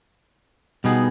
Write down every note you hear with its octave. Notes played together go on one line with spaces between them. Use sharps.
B2 G3 B3 D#4 G#4